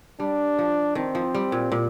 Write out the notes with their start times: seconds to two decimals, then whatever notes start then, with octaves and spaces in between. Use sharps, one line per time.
0.20 G3 D4
0.59 F3
0.95 D#3 C4
1.15 F3
1.34 G3
1.52 A#2
1.72 A#2